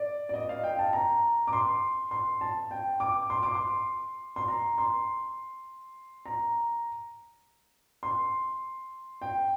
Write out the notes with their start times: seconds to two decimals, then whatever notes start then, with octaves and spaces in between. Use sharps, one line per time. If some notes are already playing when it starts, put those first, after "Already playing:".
Already playing: D5
0.29 D5
0.34 D#5
0.49 F5
0.64 G5
0.79 A5
0.93 A#5
1.47 D6
1.53 C6
2.11 C6
2.41 A5
2.71 G5
3.00 D6
3.30 C6
3.43 D6
3.55 C6
4.36 C6
4.48 A#5
4.78 C6
6.26 A#5
8.03 C6
9.22 G5